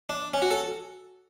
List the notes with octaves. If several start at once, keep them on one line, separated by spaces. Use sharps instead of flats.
D4
C#4
F#4
A4